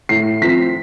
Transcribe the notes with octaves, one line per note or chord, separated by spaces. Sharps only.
A2 C7
F3 C4 B6